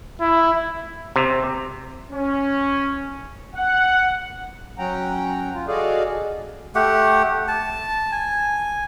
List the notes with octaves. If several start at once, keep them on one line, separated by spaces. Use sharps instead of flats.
E4
C3
C#4
F#5
F#3 C#4 F#5 G5 A#5
F4
F#4 G#4 A4 D5 D#5 F5
A3 G4 F#5
A5
G#5